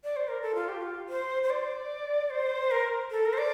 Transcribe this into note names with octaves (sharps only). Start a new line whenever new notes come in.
D5
C5
A#4
A4
F4
G4
F4
C5
C5
D5
C5
A#4
A4
A#4
C5
D5